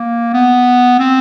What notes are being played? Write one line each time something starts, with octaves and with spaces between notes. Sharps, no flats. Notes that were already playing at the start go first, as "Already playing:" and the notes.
Already playing: A#3
B3
C4